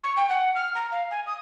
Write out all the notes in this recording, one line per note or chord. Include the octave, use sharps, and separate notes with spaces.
C#6
G5
F#5
F6
A#5
F5
G#5
D#6